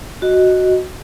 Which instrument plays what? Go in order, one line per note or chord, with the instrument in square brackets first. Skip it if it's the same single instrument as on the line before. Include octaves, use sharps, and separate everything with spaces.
[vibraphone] F#4 D#5